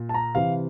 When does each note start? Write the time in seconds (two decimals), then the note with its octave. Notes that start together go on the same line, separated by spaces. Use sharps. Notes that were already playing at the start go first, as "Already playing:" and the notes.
Already playing: A#2
0.09 A5
0.14 A#5
0.35 C3 E3 F5